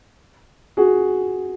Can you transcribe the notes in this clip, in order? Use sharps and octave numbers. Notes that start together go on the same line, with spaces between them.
F#4 G#4